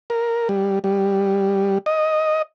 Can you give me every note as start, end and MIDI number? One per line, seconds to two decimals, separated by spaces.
0.10 0.48 70
0.49 0.79 55
0.84 1.78 55
1.86 2.42 75